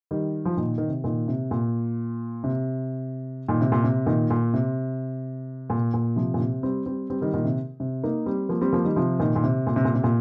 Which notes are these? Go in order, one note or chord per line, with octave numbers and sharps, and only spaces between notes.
D#3 G3
F3
A#2 D#3
D#3
C3
A#2 D#3
C3
A#2
C3
A#2 D#3
C3
A#2
C3
A#2 D#3
A#2
C3
A#2
A#2
C3 F3
A#2
C3
G3 C4
G3 C4
G3 C4
D#3 G3
A#2 D#3
C3
C3
A#3 D#4
G3 C4
F3 A#3
G3 C4
F3 A#3
D#3 G3
C3 F3
A#2 D#3
A#2
C3
A#2
C3
A#2
C3
A#2